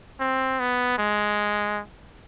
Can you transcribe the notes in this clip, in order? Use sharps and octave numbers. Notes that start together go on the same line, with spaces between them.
C4
B3
G#3